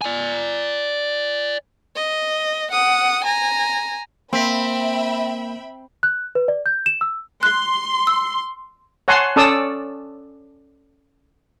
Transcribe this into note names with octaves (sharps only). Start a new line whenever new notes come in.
D5 G#5
D#5
F#5 D#6
G#5 A#5
A#3 C4 E5 G5 B5 B6
F#6
B4
D5
G6
E7
E6
C6 F#6
E6
C#5 F#5 G#5 A5 C6
C#4 A4 D5 A5 D#6 E6